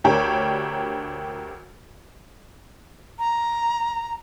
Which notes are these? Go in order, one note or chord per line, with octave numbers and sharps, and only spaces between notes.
D2 D4 G4 A#4 C#5
A#5